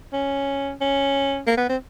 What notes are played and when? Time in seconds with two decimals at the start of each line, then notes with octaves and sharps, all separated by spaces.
0.13 C#4
0.81 C#4
1.47 A#3
1.58 B3
1.69 C4